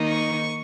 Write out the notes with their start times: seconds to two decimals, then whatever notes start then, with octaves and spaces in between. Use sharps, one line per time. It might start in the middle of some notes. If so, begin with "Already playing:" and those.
Already playing: D#3 A#3 D#4
0.08 C#6